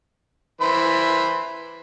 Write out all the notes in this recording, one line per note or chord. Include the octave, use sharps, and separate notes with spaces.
E3 C5 B5